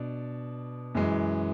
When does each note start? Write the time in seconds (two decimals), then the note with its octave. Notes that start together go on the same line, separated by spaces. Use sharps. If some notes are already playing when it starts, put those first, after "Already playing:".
Already playing: B2 D4 D5
0.95 F#2 E3 G#3